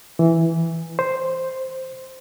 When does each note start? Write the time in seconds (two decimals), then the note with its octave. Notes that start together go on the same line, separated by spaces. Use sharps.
0.19 E3
0.99 C5